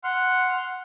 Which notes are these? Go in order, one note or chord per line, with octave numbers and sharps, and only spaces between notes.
F#5 C6 F6